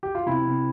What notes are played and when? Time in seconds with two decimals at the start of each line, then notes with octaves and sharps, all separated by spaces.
0.03 G4
0.15 F4
0.26 C3 E4
0.45 C3